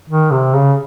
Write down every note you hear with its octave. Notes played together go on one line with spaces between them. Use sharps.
D#3
C3
C#3